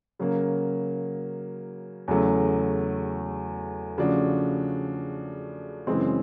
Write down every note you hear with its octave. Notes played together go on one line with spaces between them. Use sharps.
C#3 F#3 A#3
E2 C#3 F#3 A3
C#3 F3 A3 D4 F#4
F#2 C#3 E3 G#3 C4